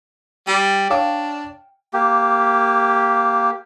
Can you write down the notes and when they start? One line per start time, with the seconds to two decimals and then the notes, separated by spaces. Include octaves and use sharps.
0.47 G3 G5
0.90 D4 C#5 F5 D6
1.93 A#3 G4